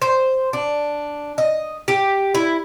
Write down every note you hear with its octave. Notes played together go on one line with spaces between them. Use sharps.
C5
D4
D#5
G4
E4